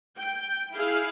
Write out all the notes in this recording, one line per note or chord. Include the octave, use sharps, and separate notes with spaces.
G5
E4 G#4 F5